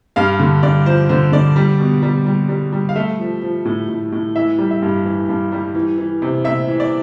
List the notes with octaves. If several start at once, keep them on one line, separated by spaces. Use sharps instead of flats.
G2 F5
D3
G2 D5
F3 C5
D3 C5
D3 D5
G3
B2
G3
G3
G3
G3
F5
A3 E5
F3
F3
A2
A2
A2
E3 E5
G3
E5
G2
E3
G2
G3
E3
E3
C3
C3 E5
E3
D5